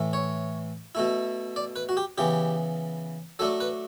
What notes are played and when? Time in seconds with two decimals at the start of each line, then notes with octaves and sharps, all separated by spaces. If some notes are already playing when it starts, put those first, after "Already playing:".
Already playing: A2 E3 A3
0.13 C#5
0.95 B2 A3 E4
1.56 D5
1.76 B4
1.89 F#4
1.97 G4
2.18 C#3 E3 B3 G4
3.39 F#3 A3 D4 A4
3.60 B4